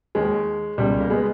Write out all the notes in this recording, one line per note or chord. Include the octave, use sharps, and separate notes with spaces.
D#2 D#3 G#3
C#2 B2 G3
A#3
G#3 B3